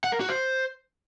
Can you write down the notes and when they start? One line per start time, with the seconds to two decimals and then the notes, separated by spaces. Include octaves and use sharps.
0.04 F#5
0.12 A#4
0.20 F#4
0.29 C5